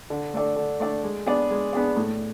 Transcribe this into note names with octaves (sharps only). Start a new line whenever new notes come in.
D3
A3 D4 A4 D5
D3
A3 D4 A4 D5
G#3
B3 D4 G#4 D5
G#3
B3 D4 G#4 D5
A2